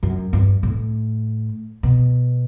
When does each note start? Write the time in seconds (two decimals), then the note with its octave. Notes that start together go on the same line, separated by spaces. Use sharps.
0.03 F#2
0.33 G2
0.63 A2
1.83 B2